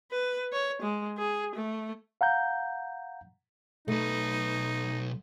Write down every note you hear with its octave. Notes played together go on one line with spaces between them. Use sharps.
B4
C#5
G#3
G#4
A3
F5 F#5 A#5 G6
B1 A3 D#4 B4